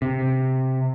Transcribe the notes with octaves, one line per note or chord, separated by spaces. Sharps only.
C3